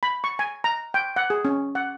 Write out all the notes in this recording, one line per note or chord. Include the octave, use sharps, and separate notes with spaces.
B5
C#6
G#5
A#5
G5
F#5
G#4
C#4
F#5